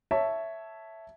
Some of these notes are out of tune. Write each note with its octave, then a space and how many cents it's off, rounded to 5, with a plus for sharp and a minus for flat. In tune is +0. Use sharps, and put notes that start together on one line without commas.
C#5 +0 E5 +0 A5 +0